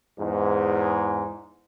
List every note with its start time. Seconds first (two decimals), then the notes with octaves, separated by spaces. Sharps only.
0.19 E2 G#2